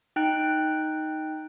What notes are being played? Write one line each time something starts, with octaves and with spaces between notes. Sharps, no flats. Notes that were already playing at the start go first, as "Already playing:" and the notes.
D#4 G5 F#6 D7